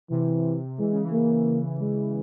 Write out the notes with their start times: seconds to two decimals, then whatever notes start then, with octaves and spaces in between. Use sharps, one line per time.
0.10 C3 E3
0.78 E3 G#3
0.92 C#3
1.04 E3
1.12 A#3
1.80 G#3